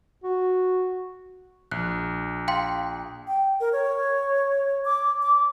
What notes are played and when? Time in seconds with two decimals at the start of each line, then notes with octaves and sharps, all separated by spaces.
0.24 F#4
1.71 A#1 F#6
2.48 F5 G5 C6
3.28 G5
3.60 A#4
3.73 C#5
4.85 D6
5.22 D6